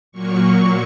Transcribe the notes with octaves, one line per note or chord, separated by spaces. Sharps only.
A#2 F#3 A#3 C#6